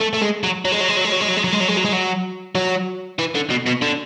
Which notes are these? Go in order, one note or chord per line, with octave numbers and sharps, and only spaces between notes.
A3
A3
G#3
F#3
F#3
G#3
F#3
G#3
F#3
G#3
F#3
G#3
F#3
G#3
F#3
G#3
F#3
G#3
F#3
G#3
F#3
F#3
E3
D3
B2
B2
D3